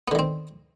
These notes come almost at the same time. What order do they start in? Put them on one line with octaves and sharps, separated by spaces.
B3 D3 D#3 C4